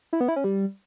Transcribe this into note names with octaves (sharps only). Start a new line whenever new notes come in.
E4
B3
E4
C#4
G3